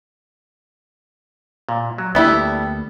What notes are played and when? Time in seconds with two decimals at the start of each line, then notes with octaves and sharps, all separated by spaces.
1.69 A#2
1.98 F#3
2.15 D2 G3 A#3 B3 D4 E4 A4